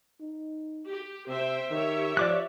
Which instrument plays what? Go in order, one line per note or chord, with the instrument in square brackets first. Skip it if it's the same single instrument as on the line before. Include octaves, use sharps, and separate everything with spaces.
[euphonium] D#4
[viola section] G4
[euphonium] C3 [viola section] C5 E5 G5
[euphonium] D#3 [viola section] G4 C#5 E5
[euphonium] F3 [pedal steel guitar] D5 D6 F#6